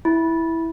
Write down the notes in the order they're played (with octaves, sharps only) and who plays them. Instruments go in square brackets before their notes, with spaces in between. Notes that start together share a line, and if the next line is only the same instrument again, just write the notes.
[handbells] E4